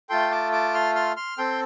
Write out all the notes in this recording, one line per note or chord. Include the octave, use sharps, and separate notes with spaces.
A3 F4 A4 G5 C6
A5 D6
A5 D6
C6 F6
C6 F6
C6 F6
C4 A4 G5 C6